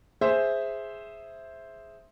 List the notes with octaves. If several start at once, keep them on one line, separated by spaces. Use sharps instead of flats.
G#4 C5 E5